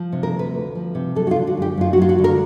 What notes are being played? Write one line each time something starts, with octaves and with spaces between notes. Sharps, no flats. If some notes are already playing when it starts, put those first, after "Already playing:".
Already playing: F3
C3
A#4
D2
B4
D2
F3
C3
F#3 A4
F#4
F4
D3
F#4
F#2 G4
F#2 F4
F#4
F#3 F4
F#4
D3
A#4